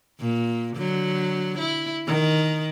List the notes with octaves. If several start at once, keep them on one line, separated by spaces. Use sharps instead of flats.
A#2
D3 F#3
E4
D#3